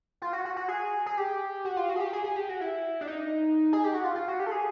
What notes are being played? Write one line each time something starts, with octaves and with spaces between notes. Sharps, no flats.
F4
F#4
F#4
F#4
G#4
G#4
G4
F#4
F4
F#4
G#4
G4
G#4
G#4
G4
F#4
E4
D4
D#4
G#4
G4
F#4
F4
F4
F#4
G4
A4
G#4